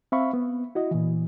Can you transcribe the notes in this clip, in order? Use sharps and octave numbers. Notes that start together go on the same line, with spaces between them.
C4 E5 F5 B5 C#6
B3
E4 F#4 D#5
A#2 E3